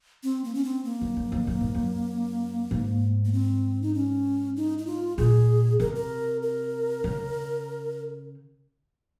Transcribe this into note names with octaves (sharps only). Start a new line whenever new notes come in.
C4
A#3
C#4
C4
A#3
F#2
F#2
F2
F#2
G#2
F#2
G#2
A#3
C4
D#4
C#4
D#4
D#4
F4
A#2 G#4
C3 A#4
A#4
A#4
C#3